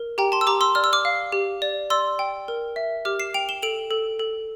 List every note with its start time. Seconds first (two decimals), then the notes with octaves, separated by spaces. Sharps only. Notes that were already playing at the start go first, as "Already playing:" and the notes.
Already playing: A#4
0.18 G4 G5 A#5
0.32 A5 C6
0.41 E6
0.47 G4 A#5 D6
0.61 C6 E6
0.75 D5 F6
0.84 E6
0.93 D6 F6
1.05 F5
1.32 G4
1.62 D5
1.90 D5 C6 E6
2.19 G5
2.48 A#4
2.76 E5
3.05 G4 D6 F6
3.20 C7 E7
3.34 G5 D7 F7
3.49 E7 G7
3.62 A4 D7 F7
3.91 A4
4.19 A4